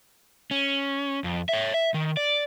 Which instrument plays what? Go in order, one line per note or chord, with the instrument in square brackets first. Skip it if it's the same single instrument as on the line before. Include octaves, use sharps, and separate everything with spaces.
[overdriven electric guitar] C#4
F2
C#5 E5
E5
D#3
D5